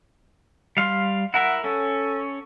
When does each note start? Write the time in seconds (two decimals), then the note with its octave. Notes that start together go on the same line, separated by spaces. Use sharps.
0.77 G3 F5 C6
1.34 E4 A#4 E5 F#5
1.64 C#4 A4